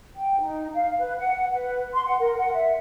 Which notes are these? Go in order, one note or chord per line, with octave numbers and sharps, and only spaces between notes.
G5
D#4
F5
B4
F#5
B4
C6
F#5
A#4
F#5
E5